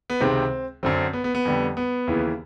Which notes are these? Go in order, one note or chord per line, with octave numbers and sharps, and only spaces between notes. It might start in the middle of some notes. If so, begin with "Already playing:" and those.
B3
C#2 C3 D#3 G#3 C4
F#2 D3 F#3 C4
B3
B3
B3
F2 D3 G3
B3
D#2 C#3 E3